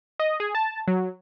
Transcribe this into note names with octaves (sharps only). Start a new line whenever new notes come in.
D#5
G#4
A5
F#3